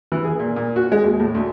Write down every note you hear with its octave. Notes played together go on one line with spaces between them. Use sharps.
E3
G#4
A#2
A#2
F#4
G#3
D#2
A2
D2